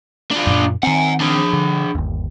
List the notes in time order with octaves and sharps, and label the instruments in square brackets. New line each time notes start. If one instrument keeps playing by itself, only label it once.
[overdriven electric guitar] D4 F4
[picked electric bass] F#2 A#2
[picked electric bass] D#3 C4 [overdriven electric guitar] F#5 G#5
[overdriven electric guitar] D4 G#4
[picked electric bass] D3
G1 D#2